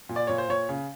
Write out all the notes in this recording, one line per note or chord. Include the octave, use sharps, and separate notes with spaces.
A#2
D5
A#2 C#5
C5
A#2 C#5
C#3